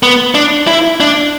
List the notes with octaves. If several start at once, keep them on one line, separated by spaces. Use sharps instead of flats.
B3
D4
E4
D4